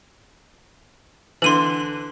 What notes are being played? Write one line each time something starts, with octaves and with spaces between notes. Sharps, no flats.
D3 E3 C6 D#7 F#7